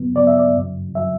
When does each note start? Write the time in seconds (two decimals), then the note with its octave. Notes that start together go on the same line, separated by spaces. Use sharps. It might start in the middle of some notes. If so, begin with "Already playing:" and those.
Already playing: C#3 F#3 B3
0.16 C#3 F#3 B3 D5
0.27 E5
0.38 D5
0.56 F#2 C#3 F#3
0.95 C#3 F#3 E5